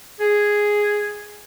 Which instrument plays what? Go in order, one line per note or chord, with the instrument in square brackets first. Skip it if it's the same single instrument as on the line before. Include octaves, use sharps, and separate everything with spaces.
[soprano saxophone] G#4